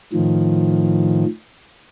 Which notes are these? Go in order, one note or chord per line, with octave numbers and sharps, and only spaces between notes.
A2 D#3 F3